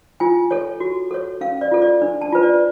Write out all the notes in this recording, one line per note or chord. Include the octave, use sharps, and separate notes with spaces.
F4 G#5
A4 C#5
F#4
A4 C#5
C#4 F5
D5
F4 A4
D5
D4
A5
F4 B4
D5